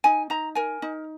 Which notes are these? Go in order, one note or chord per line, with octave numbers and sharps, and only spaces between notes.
D#4 G#5
D#4 A#5
A#4 G#5
D#4